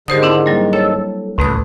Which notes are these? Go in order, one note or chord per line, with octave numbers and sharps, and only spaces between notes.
G#2 D3 D#3 G4 C5 D#6
C4 D4 E4
F#3 G3 A#3
A4 C#5
C#2 A2 A3 B4 D#6